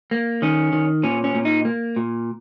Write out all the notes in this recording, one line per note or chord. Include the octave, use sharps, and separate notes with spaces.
A#3
D#3 C#4
D#3
A#2 C#4
C#4
A#2
D#4
A#3
A#2